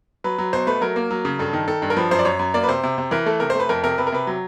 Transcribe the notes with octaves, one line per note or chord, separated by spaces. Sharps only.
F#3 B4
F#3
B2 C5
A3 B4
F#3 A#4
A#3
F#3
C#3
G2 A4
D#3
D#3 A4
G2
A#4
F3 B4
F#2 C5
D5
F#2 C#5
F#2
A#3 D5
B4
C3 C5
C3
C3
E3 A#4
A3 A4
C3 A#4
A3 C5
B4
F2 A#4
C3 A#4
C3 B4
A#4
C3 B4
F#3